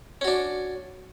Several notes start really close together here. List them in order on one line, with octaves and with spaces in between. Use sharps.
C#4 F#4 D4